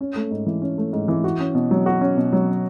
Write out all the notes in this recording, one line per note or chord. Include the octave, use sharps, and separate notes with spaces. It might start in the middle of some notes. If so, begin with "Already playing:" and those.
C#4
A3
G#2
E3
C#4
A3
G#2
E3
F#4
C#4
B2
F#3
F#4
C#4
B2
F#3